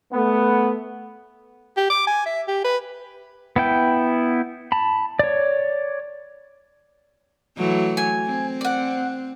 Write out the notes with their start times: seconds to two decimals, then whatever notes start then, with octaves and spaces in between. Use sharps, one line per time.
0.12 A3 B3
1.77 G4
1.90 D6
2.07 G#5
2.26 E5
2.48 G4
2.64 B4
3.56 B3 E4 G5
4.72 A5 B5
5.19 C#5 D5
7.57 E3 F#3 A3
7.97 G#5
8.26 C4
8.61 D5 F#5